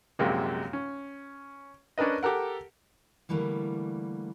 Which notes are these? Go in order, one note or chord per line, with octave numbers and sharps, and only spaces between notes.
A#1 F#2 C3 G#3 A#3
C#4
C#4 D4 A#4 B4 D#5
G4 A4 A#4 F#5
D3 E3 G3 A3 A#3